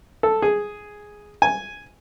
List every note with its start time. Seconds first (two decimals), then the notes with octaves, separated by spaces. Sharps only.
0.23 A4
0.42 G#4
1.42 G#5